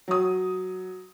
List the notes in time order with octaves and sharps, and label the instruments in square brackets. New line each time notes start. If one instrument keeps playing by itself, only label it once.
[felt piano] F#3 D#6